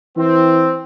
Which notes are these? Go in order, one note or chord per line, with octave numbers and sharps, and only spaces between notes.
E3 C4